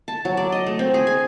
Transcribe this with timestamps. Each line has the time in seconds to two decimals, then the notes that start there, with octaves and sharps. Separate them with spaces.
0.08 A5
0.25 F#3
0.37 D5
0.52 D#5
0.66 A3
0.79 C4
0.94 G#4
1.07 G#5